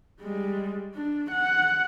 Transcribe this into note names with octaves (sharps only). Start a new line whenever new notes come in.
G3 G#3
D4
F#5